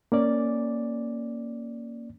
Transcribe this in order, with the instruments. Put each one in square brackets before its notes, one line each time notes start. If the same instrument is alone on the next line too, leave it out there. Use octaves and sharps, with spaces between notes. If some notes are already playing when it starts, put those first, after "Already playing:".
[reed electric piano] A#3 C#4 D5